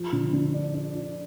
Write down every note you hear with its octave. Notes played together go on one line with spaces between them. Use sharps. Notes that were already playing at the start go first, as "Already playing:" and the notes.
Already playing: F3
D3
D3
D4
D4
D4